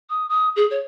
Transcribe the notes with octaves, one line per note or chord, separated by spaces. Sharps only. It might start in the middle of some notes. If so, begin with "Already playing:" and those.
D#6
D#6
G#4
C#5